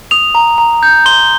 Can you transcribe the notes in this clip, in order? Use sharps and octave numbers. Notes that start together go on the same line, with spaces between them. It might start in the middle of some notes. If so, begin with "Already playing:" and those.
D#6 F7
A#5
A#5
G6
C6 G7